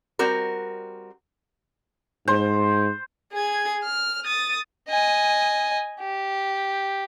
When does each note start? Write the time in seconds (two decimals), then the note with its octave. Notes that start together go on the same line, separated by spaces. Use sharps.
0.19 G3 C4 F#4 A#4
2.28 G#2 C5
3.32 G#4 G#6
3.84 F6
4.24 D#6 A6
4.89 D#5 G#5
6.01 G4